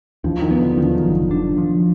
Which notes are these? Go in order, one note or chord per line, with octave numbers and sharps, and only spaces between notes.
D#2 F3
D#3
B3
D3
D#3 F3
F#3
F#1
D4
F3